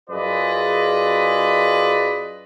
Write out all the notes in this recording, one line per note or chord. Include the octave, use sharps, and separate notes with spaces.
F#2 F4 G#4 B4 D5 D#5